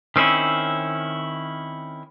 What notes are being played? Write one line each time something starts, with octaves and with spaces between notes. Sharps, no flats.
D#3 C4 C#4 E4